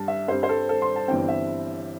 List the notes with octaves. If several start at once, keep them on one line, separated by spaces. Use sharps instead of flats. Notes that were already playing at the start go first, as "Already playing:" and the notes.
Already playing: G2 G3 D4 A5
E5
G2 G3 C4 C5
C5
A4
A4
C6
A5
G1 G2 E3 C4 G5
E5